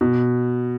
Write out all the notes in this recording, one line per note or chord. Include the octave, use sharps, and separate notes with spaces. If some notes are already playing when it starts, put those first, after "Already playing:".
B2